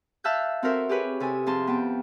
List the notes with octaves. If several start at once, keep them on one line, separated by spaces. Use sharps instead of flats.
E5 F5 A5 E6 F#6 G6
C4 F#4 A4 A#4 C5 E5
G4 G#4 B4 C#5
C3 A4 G#5 D#6
F2 G#4 A5 C6
B3 G5 A5